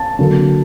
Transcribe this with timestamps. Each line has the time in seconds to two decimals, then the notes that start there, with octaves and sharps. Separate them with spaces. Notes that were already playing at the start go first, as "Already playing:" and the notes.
Already playing: A5
0.19 D3 F#3 A#3